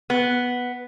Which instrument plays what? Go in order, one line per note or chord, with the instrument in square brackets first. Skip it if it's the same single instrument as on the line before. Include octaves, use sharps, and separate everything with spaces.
[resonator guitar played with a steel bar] B3